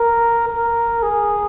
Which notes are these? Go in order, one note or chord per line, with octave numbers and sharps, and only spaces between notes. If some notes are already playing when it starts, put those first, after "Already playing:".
Already playing: A#4
A#4
G#4